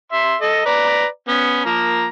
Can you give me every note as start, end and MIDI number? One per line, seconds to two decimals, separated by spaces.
0.12 0.35 76
0.12 0.35 84
0.41 0.64 69
0.41 0.64 75
0.66 1.06 71
0.66 1.06 74
0.66 1.06 82
1.28 1.63 59
1.28 1.63 61
1.65 2.06 53
1.65 2.06 58
1.65 2.06 82